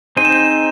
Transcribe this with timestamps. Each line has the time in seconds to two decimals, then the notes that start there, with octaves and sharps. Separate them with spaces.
0.17 C4 D#4 G#4 C5 D#7
0.25 E7
0.32 D#7